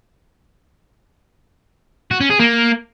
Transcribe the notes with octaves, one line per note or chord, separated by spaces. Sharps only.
F#4
C#4
G#4
A#3